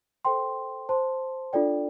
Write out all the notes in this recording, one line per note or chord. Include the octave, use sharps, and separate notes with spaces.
A4 C5 G5 C6
C5 A5 C6
D4 F4 A4 D5 G5